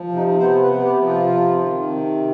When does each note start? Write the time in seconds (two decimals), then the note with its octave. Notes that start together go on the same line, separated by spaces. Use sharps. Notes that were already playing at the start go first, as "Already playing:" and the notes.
Already playing: F3
0.09 C3
0.16 D#4
0.39 B3 C5
0.62 B4
0.69 C3
0.84 G4
0.99 F3
1.07 F4
1.29 C3
1.60 D#3
1.91 C3